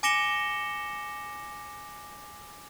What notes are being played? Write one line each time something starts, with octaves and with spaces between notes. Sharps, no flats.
G#5 D6 A#6 C#7 E7 G7